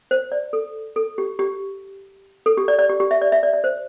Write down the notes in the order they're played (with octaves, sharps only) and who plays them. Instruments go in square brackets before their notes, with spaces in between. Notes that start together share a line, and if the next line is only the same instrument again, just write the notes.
[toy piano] C5
D5
A4
A4
G4
G4
A4
G4
D5
D5
G4
G4
E5
D5
E5
D5
D5
C5